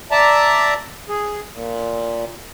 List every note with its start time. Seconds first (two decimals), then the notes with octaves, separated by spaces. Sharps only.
0.11 D5 E5 A5 A#5
1.09 G#4
1.53 A#2